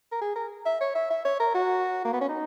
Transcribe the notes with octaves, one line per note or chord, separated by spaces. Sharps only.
A#4
G#4
A#4
E5
C#5
E5
E5
C#5
A#4
F#4
A#3
B3
C#4
D#4